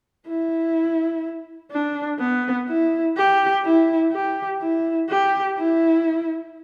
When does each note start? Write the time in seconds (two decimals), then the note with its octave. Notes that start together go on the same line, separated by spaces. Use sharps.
0.27 E4
1.72 D4
2.19 B3
2.68 E4
3.17 G4
3.64 E4
4.12 G4
4.61 E4
5.10 G4
5.58 E4